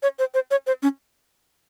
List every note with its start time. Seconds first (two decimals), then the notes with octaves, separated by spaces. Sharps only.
0.03 C#5
0.19 C5
0.34 C5
0.51 C#5
0.67 C5
0.83 C#4